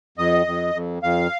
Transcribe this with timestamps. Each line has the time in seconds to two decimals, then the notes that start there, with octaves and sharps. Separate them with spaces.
0.18 F2 D#5
0.46 F2
0.75 F2
1.03 F2 F5